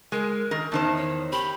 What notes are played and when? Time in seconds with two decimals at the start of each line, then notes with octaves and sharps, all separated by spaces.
0.12 G#3 A#4
0.51 D#3 A#4
0.72 E2 D#3 C5 A5
0.96 C#5
1.33 G4 B5